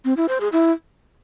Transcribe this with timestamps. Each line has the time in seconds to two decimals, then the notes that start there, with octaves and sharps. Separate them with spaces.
0.05 C4
0.17 E4
0.29 C5
0.41 G#4
0.52 E4